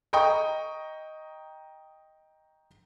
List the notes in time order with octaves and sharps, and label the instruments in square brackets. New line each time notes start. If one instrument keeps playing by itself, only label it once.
[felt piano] D#5 G5 A#5 C#6 D#6